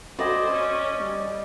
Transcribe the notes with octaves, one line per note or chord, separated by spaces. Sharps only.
F#4 C5 D5 D#5 G#5
C#4
G3